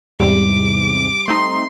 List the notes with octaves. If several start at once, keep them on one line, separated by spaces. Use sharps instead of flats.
E2 G#2 C3 G3 D6
A3 C4 D#4 C6